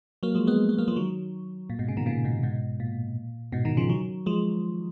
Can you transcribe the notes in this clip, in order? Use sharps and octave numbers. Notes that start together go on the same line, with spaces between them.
F#3 A#3
F3 G#3
G#3 B3
G#3 B3
F#3 A#3
F3 G#3
D#3 F#3
A#2
G#2 B2
A#2 C#3
B2 D#3
A#2 C#3
G#2 B2
G#2 B2
A#2
G#2 B2
B2 D#3
C#3 F3
D#3 F#3
F3 G#3